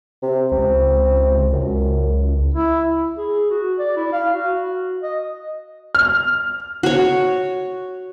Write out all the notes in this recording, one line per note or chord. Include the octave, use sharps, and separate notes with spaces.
C3
C#2 C4
C#2 F#2
E4
G#4
F#4
D5
E4
F5
F#4
D#5
F6
F#4 C#5